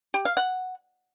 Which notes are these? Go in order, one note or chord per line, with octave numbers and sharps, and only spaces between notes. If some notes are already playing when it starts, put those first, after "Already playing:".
G4
F5
F#5